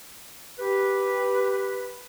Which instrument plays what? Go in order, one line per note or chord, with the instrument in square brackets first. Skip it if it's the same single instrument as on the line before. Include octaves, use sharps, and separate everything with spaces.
[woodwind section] G4 B4